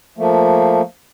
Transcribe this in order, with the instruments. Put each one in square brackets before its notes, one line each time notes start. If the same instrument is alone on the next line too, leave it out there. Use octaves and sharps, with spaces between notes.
[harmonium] F3 A3 A#3